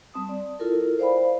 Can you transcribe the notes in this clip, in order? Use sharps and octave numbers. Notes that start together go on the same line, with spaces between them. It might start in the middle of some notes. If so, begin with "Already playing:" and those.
G3 C4 A5 D#6
D5
E4 F4 A4 A#4
C5 D5 F5 G5 B5